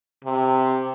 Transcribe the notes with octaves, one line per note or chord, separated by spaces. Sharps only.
C3